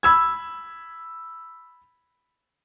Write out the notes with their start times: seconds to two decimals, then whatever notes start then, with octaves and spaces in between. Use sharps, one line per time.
0.03 B5 E6 G#6